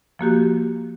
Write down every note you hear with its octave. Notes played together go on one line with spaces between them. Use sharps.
F3 A#3 F#4 G4